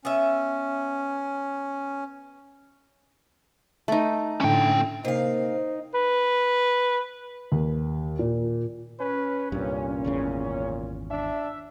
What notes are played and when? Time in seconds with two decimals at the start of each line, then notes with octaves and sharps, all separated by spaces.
0.05 B3 C#4 E5
3.88 A3 D#4
4.41 A2 D3 C#4 G5
5.05 C3 A#3 D#4 C5 F5
5.94 B4
7.52 D#2
8.19 A#2
9.00 C#4 B4
9.52 C2 G2 A#2
10.04 G#1 E2 C#3
11.10 D4 E5